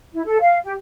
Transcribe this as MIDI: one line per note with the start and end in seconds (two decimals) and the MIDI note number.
0.14 0.22 64
0.25 0.39 69
0.40 0.57 77
0.63 0.74 67